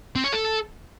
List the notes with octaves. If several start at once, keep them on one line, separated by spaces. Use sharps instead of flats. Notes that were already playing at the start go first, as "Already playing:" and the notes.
C4
C#5
A4